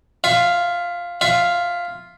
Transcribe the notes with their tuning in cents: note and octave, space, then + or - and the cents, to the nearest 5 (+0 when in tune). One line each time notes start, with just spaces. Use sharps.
F4 +0 E5 +25
F4 +0 E5 +20